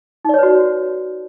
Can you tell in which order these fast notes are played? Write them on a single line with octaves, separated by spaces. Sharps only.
D#4 D5 C#5 B4 F#4